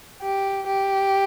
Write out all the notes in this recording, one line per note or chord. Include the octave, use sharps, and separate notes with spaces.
G4
G4